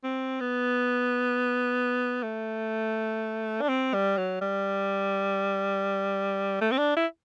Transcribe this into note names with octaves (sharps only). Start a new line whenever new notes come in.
C4
B3
A3
D4
C4
G3
F#3
G3
A3
C4
D4
E4